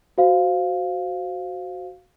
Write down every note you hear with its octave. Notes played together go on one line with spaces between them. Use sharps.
F#4 C5 F5